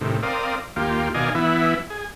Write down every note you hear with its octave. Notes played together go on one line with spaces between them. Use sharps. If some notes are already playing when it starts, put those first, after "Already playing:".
A2 C3 D#3
C4 A#4 D5 F5 D#6
D#2 A#3 F4 G4
B2 D#3 D5 D#5 F5 G#5
E3 B3 E4
G#4